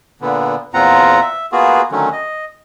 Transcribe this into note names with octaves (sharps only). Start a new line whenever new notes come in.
A#2 D3 B3
E2 A#2 C4 F4 F#5 A#5
E5
A#3 B3 F4 F#4 G#4
D3 D#3 F#3 A3 C#4
D#5